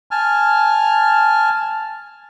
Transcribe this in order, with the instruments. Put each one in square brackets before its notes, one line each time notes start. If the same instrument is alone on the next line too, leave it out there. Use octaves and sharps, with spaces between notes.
[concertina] G#5 A5 F6